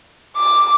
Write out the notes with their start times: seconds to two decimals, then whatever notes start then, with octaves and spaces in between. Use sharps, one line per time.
0.37 D6